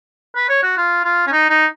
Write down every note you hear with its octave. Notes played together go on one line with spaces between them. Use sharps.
B4
C#5
F#4
F4
F4
C#4
D#4
D#4